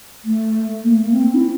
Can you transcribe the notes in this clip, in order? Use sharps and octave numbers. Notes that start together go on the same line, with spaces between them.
A3
A#3
A3
A#3
C4
E4